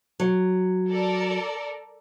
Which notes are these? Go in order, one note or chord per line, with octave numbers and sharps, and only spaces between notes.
F#3
A4 A#4 D5